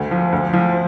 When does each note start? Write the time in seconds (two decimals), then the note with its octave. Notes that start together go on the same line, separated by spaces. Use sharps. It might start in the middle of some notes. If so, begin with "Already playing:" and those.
Already playing: D2 A3
0.11 F3
0.32 D2
0.53 F3